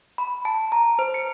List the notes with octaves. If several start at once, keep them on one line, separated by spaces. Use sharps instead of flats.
B5
A5
A#5
C5
C#7